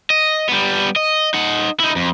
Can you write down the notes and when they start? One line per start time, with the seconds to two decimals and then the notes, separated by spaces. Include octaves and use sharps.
0.10 D#5
0.49 G3 B3
0.96 D#5
1.34 D#4 F#5
1.80 D#4 E4
1.96 F2